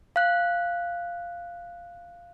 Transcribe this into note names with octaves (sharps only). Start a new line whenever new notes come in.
F5 F#6